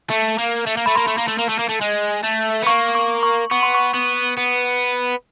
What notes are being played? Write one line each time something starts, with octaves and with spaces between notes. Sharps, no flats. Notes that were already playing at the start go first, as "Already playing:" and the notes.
A3
A#3
A3
A#3
A3 B5
A#3 C6
A3
A#3
A3
A#3
A3
A#3
A3
G#3
A3
B3
A#3 C#6
C#6
C#6
B3 C#6
C6
C#6
B3
B3